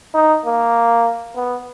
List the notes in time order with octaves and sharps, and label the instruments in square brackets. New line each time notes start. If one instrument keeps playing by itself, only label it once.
[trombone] D#4
A#3
B3